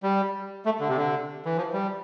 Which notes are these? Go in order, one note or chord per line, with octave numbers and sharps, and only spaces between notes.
G3
A3
D3
C3
D3
E3
F3
G3